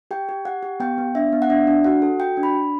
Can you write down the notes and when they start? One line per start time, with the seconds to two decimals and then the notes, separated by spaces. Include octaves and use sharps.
0.11 G4 G5
0.29 G4
0.45 G4 F#5
0.63 G4
0.80 B3 G5
0.98 B3
1.15 D4 E5
1.33 B3
1.42 F#5
1.50 D4 E5
1.67 D4
1.84 F#4 F#5
2.02 A4
2.20 F#4 G5
2.37 D4
2.43 B5
2.54 D4